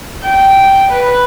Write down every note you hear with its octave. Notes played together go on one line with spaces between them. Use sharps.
G5
B4